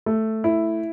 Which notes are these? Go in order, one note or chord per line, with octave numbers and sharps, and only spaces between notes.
A3
E4